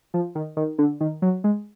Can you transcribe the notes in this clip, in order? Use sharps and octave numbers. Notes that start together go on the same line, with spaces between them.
F3
D#3
D#3
D3
D#3
F#3
G#3